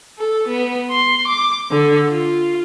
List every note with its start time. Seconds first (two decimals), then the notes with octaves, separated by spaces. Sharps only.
0.18 A4
0.48 B3
0.91 C6
1.28 D6
1.71 D3
2.10 F4